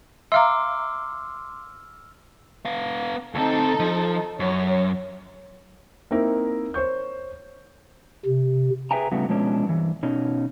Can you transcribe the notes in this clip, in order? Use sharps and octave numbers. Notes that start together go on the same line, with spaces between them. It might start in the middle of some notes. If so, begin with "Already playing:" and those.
E5 F5 A#5 C6 D6 E6 F6
B3 F5
D2 C4 D#4 A4
F3
F#2 C#5
A#3 C4 D#4 E4 A#4
C5 C#5 C#6 G6
C3
G#4 B4 E5 G5 G#5 A#5
A2 C#3 G3 A3 B3 F#4
B2 F3 G#3 B3 C#4 D4
G2 E3
B2 C#4 D#4